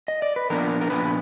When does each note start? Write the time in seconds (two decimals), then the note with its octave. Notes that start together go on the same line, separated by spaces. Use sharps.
0.08 D#5
0.22 D5
0.36 B4
0.50 A#2 F3 B3 D4 A#4
0.81 A#4
0.90 A#2 F3 B3 D4 B4